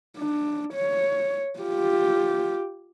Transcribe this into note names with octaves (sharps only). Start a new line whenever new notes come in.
D4
C#5
F4 G4